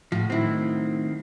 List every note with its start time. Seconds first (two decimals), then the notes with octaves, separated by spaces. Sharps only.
0.12 A2 C#3 F3 F#4
0.30 D#3 F#3 C4 E4